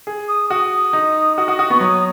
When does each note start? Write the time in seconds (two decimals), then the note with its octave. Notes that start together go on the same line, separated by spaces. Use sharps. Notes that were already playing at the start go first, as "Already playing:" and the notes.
0.07 G#4
0.28 D#6
0.50 F#4 D#6
0.93 D#4
1.37 F#4 D#6
1.48 F#4 D#6
1.59 F#4 D#6
1.70 B3 C#6
1.80 F#3 D#6